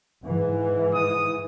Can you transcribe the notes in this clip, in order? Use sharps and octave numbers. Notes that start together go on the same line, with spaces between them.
G#2 E3
D#6